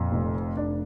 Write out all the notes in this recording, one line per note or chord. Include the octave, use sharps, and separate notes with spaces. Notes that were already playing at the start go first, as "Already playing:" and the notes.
Already playing: F2 A#2
F1
D4